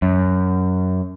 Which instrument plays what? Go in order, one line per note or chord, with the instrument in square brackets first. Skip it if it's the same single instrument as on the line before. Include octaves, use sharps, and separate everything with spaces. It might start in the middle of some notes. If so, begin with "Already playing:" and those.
[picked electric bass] F#2